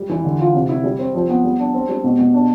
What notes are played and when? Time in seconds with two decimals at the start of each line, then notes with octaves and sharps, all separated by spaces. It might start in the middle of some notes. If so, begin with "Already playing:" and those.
Already playing: G3
0.09 E3
0.24 D3
0.40 F4
0.54 C3
0.69 E4
0.84 G3
0.99 C4
1.15 F3
1.29 B3
1.44 G3
1.59 D4
1.74 C4
1.89 G3
2.04 B2
2.19 B2
2.34 D4